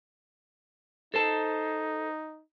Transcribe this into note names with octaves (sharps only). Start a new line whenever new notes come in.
D#4 A4 C5 A5